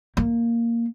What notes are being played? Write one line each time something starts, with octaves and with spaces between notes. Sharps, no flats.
A#3